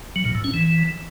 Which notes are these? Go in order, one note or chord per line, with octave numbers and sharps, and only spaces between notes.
F#3
A#2
A2
C#4
E3